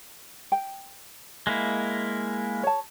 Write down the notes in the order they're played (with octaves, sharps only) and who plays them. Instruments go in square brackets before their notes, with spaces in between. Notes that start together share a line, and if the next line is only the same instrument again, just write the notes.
[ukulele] G5
[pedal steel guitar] G#3 A#3 E4
[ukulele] C#5 A5